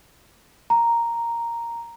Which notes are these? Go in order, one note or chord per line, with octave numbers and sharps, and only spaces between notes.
A#5